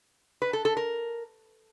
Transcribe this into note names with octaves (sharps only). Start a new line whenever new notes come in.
B4
A4
A4
A#4